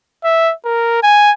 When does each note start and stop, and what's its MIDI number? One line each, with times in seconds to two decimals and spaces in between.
0.24 0.53 76
0.65 1.01 70
1.03 1.31 80